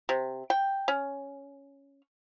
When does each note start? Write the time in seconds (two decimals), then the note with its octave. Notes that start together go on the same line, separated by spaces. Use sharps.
0.09 C3
0.50 G5
0.88 C#4